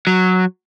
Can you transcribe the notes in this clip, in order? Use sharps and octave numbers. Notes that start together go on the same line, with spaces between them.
F#3